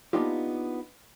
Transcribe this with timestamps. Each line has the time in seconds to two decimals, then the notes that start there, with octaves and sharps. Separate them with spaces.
0.13 A#3 B3 D4 D#4 F4 G4